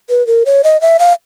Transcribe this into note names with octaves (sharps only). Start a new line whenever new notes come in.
B4
A#4
C#5
D#5
E5
F5